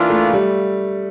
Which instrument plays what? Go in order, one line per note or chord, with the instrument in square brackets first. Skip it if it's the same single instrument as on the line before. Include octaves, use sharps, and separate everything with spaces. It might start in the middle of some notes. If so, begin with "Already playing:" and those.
Already playing: [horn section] E3 A#3 D4 F4
[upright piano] A3
G3